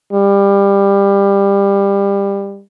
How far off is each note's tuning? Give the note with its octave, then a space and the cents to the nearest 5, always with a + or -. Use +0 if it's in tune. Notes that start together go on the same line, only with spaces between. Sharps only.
G3 +20